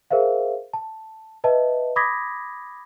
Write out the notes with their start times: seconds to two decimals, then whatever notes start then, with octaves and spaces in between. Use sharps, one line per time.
0.11 G#4 A#4 C5 E5 F5
0.73 A5
1.44 B4 D#5 E5 A5
1.96 B5 D6 D#6 G#6 A#6 B6